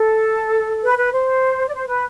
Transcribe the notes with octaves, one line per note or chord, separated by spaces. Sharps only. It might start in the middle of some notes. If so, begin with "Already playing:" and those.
Already playing: A4
B4
B4
C5
D5
C5
B4